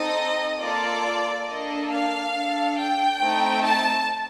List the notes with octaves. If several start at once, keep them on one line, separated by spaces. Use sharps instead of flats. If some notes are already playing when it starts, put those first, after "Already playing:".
Already playing: C4 D#4 A4 D#5
A#3 F4 A4 D5
A#3 D4 A4 D#5
F5
D4 A4
G5
A3 C4 D#4
A5